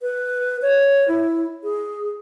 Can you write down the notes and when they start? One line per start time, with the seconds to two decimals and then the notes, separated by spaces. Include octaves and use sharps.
0.02 B4
0.62 C#5
1.08 E4
1.63 G#4